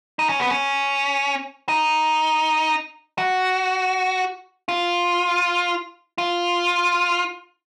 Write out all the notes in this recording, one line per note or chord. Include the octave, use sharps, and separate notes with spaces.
D#4
C#4
B3
C#4
D#4
F#4
F4
F4